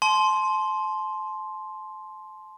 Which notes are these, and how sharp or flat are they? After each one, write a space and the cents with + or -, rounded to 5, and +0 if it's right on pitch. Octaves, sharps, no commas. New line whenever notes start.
A5 -35 C6 +0